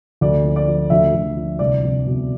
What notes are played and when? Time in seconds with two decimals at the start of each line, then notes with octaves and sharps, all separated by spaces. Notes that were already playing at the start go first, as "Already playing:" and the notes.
0.21 D2 D5
0.45 F3
0.56 D5
0.68 F3
0.90 D2 E5
1.14 D2
1.36 F3
1.59 C2 D5
1.83 C2
2.06 B2